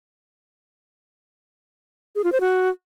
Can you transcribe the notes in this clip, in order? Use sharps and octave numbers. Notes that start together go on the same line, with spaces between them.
G#4
F4
C5
F#4